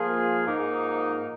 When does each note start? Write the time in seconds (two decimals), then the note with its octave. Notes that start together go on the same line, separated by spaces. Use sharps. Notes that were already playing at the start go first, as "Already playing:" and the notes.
Already playing: F3 A#3 F4 G#4
0.46 G#2 F3 A#3 D#4